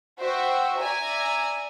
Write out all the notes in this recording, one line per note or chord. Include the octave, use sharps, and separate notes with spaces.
F#4 C5 E5 G5
D5 E5 G#5 A#5